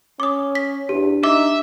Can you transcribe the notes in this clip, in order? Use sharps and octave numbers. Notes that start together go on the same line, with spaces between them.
C#4 D6 D#6
B6
E2 D4 G4
D#4 E5 D6